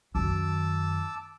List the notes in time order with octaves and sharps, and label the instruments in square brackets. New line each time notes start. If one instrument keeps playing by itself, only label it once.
[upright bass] F#2 D#3 [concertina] A5 D6 E6